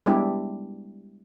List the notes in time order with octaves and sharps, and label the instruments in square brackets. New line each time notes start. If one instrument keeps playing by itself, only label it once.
[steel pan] G3 G#3 B3 D4 E4 G4